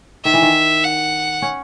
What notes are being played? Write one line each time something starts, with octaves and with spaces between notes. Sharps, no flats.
D#3 E5
E3
D#3
F#5
C#4